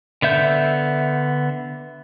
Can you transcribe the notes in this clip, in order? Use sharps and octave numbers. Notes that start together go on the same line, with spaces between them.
D3 B3 E5 G6